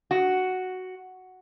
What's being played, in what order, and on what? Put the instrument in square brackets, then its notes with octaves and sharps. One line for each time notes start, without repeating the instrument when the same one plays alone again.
[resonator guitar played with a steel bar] F#4